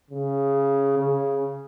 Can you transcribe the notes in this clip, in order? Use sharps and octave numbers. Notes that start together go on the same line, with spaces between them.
C#3
C#3